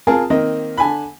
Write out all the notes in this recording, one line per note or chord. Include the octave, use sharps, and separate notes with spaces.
C4 F4 G#4 A#4 A5
D#3 A#3 C4 D#5
D3 G#5 A5 B5